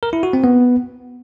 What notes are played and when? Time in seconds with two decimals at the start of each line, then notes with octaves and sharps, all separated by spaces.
0.03 A#4
0.13 E4
0.23 F#4
0.33 C4
0.44 B3